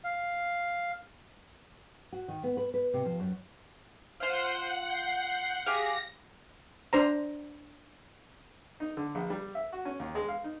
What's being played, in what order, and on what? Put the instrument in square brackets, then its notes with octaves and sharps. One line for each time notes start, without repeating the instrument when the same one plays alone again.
[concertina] F5
[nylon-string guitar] F#4
D#3
B3
B4
B4
C3
F3
F#2
[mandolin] F4 F5 [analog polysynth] C5 G6 C7 [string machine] F#5
[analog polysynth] G6 C7
[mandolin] G4 F5 [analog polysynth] G#4 [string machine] A#6
[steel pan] D4 C5 A#5
[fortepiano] D#4
D3
A#1
G3
E5
F#4
C#4
D#2
G#3
F5
D#4